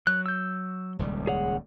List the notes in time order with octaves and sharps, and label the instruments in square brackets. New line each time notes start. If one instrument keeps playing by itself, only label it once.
[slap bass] F#3 [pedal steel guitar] F#6
[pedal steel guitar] E6 G6
[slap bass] D#1 C#2 G3
[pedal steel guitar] G#4 C#5 F#5